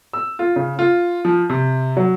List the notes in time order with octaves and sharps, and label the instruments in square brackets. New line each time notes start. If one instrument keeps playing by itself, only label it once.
[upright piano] E6
F4
C#3
F4
F3
C3
F#3